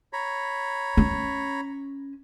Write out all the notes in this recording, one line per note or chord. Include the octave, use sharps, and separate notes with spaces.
C#5 A#5 B5
C#4